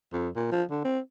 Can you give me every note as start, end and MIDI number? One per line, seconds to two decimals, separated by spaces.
0.13 0.29 41
0.36 0.48 46
0.52 0.63 53
0.71 0.82 50
0.85 0.99 60